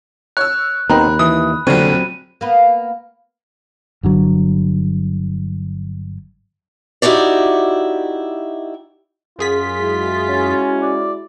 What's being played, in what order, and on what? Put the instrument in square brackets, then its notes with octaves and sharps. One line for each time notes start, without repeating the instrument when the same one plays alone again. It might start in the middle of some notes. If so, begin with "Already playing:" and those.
[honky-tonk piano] C#5 E6 [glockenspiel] F#6
[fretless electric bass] D#2 [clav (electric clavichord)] B3 C4 D#4 [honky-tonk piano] A#4 [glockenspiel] B5 F#6
[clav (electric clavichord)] E3 [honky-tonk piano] D#6
[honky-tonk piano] F1 A#1 [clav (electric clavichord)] D3 C#5 [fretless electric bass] F#3 C4 [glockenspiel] D#7
[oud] A#3 B3
[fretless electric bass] G1 D3 F#3
[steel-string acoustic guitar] D#4 E4 F#4 G4 D5
[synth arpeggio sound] F#2 G#4 B6 [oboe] F4
[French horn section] G#3 E4 F#4
[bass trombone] C#4
[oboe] D5